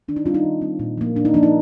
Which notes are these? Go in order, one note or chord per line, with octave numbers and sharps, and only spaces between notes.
D#3 D4
D#4
G3 C4 D4 F4
D#4
D#3
G3 C4
A#2
F3 A#3
A#2 D4
D#4
F3 A#3 D4
D#4